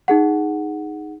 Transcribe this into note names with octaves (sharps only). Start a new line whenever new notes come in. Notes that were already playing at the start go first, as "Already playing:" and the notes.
D#4 G#4 F#5